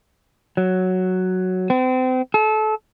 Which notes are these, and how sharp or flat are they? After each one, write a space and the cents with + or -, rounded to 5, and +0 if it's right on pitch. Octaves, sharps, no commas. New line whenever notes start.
F#3 +0
C4 -35
A4 -30